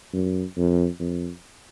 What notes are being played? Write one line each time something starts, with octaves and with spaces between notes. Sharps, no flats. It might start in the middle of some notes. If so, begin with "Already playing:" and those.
F#2
F2
F2